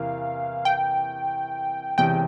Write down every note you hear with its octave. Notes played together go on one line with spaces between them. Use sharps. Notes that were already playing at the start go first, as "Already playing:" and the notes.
Already playing: E2 C3 E3 A#3 F5
G5
E1 E2 C3 G5